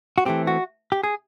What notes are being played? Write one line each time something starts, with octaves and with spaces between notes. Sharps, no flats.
F#4
E3 A3 C4 G4
F#4
G4
G#4